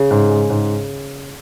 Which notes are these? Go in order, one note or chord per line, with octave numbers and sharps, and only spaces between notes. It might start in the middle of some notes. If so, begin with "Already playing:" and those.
Already playing: C#3
G#2
G#3
G#2